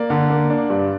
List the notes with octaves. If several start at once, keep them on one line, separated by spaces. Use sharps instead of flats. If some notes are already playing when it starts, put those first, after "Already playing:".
Already playing: A#3 D5
D3
A#3
D4
G2